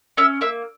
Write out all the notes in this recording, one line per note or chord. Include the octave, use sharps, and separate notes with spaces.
C#4 E5
A#3 E5